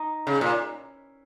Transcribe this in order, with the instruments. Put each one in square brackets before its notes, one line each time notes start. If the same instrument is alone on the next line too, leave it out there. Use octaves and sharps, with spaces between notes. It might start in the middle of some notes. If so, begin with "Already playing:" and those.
Already playing: [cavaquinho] D#4
[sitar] C#3
A#2